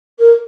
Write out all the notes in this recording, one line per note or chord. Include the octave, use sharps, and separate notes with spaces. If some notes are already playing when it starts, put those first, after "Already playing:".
A#4